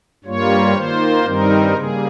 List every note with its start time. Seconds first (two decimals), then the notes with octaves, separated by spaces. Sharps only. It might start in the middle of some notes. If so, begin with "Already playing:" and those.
0.24 G2 G3 A#3 F4 C#5
0.74 D#3 A#3 F4 C5
1.24 G2 D#3 G3 C4 D#4 A#4
1.74 C#3 G3 A#3 G#4